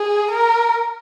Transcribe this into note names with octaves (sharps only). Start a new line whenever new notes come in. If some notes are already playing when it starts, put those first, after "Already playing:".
Already playing: G#4
A#4